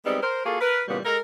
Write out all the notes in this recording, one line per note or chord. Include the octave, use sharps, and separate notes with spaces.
G3 G#3 B3 C4 D#4
A#4 C5
A#3 F4 F#4 G#4 A4
A#4 B4
A#2 C#3 E3 G3 B3
G#3 A4 A#4